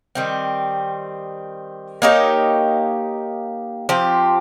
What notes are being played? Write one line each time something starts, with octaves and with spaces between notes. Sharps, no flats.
D#3 G3 C4
A#3 D#4 G4 C#5
F3 C4 G4